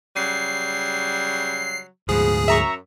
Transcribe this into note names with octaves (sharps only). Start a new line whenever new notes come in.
C#3 F#3 G3 C7
D2 G#2 B2 F3 G#4
F#2 E5 A#5 C#6